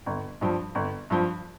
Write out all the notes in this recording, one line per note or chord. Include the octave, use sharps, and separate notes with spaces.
G1
G2 F3
G1
G2 F3